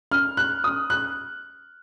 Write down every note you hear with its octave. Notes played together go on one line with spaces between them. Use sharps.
F6
F#6
D#6
F#6